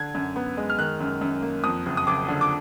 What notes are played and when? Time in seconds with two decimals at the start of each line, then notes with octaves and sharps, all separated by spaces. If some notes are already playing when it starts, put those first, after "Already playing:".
Already playing: D3 G#6
0.15 F#2
0.36 B3
0.57 G#3
0.70 F6
0.79 D#3 F#6
1.00 F#2
1.21 F#2
1.42 A#3
1.64 F2 D#6
1.86 F#1
1.97 D#6
2.07 F#1 D6
2.28 D3
2.41 D6